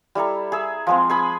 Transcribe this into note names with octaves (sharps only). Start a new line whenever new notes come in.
G3 E4 A4 A#5
G#4 E5
F3 G#3 C4
G#4 G#5 B5